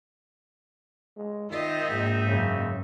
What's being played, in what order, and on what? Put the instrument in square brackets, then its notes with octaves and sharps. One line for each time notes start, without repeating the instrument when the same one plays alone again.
[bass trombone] G#3
[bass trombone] D#3 [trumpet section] C4 D#4 E5 [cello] F4 D#5
[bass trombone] A#1 [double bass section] G#2 A#3
[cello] F#2 [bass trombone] C#3